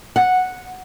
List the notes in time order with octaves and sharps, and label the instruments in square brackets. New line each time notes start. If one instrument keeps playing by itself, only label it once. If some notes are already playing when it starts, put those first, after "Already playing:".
[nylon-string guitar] F#5